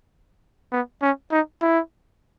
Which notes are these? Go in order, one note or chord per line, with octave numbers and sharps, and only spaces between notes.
B3
C#4
D#4
E4